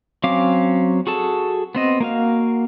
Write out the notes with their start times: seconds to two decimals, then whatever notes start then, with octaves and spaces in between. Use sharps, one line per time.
0.24 F#3 C4 C#4 F5 D6
1.07 F#4 G#4 A4 A5
1.75 B3 C4 D#5
2.00 A#3 F#4 F5